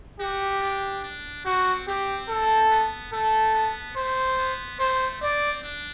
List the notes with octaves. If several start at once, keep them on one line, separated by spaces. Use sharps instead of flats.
F#4 G4
D4
D4
C4 F#4
C4 G4
A4
B3
A3 A4
B3
A3 C5
B3
A3 C5
C4 D5
D4